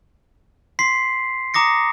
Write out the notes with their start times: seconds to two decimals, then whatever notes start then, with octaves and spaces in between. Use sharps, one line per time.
0.79 C6 B6 C7
1.54 A#5 D6 D#6 A#6 C#7